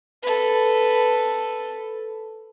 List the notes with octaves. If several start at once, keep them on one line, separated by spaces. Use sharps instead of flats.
A4 B4